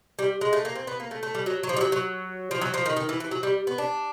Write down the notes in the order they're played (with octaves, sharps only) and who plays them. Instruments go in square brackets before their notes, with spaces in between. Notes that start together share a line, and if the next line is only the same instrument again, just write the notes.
[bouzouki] G3
G#3
A3
A#3
C4
B3
A#3
A3
A3
G3
F#3
F#3
F3
G3
F#3
F#3
F3
F#3
F3
D#3
D#3
E3
E3
F#3
G3
B3
D4